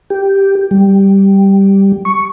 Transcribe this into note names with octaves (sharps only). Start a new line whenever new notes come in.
G4
G3
C#6